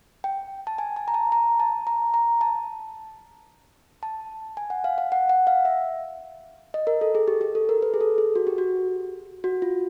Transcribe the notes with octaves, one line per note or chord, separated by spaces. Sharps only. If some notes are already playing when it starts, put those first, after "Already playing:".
G5
A5
G#5
A5
A#5
A5
A#5
A5
A#5
A#5
A5
A5
G#5
F#5
F5
F5
F#5
F#5
F5
E5
D#5
A#4
A4
G#4
G4
G4
A4
A#4
B4
G#4
A4
G#4
F#4
G4
F#4
F#4
F4